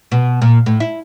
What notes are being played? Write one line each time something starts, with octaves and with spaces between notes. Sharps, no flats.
B2
A#2
A2
E4